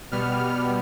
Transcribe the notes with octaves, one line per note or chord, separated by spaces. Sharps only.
B2 G3 B3 F6